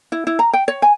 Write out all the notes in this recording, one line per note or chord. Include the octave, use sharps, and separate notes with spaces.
E4
E4
A#5
G5
C#5
G#5